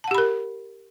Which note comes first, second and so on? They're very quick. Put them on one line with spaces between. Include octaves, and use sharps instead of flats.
A5 F#5 G4 B5 A#4